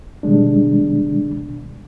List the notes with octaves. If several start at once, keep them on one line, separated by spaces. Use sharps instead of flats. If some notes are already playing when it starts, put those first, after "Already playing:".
B2 D#3 G3 G#3 D4